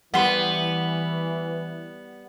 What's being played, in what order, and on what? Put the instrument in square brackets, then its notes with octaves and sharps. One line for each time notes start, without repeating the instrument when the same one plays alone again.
[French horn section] E3 [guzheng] G3 C6 [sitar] B3 [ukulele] F#5